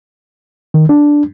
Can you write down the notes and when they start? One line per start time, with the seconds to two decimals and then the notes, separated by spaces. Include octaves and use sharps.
0.74 D#3
0.89 D4